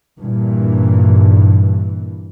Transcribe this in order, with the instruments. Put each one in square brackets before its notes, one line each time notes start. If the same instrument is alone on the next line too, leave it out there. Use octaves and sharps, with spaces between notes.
[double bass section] G2 A#2 E3